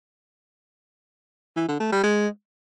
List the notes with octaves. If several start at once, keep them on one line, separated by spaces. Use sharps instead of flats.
E3
D3
A3
G3
G#3